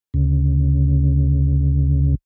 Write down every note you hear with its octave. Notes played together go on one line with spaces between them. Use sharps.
D2 C#3